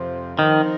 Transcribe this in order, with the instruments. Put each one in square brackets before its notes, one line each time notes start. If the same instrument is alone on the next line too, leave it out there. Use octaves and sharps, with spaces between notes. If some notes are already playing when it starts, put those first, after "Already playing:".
Already playing: [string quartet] F2 C3 F3 C4
[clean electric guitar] D#3 [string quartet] F3 C4 D#4 A#4